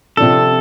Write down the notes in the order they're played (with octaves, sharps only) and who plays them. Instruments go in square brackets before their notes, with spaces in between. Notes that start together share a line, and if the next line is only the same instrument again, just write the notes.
[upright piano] C3 F3 D4 [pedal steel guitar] A4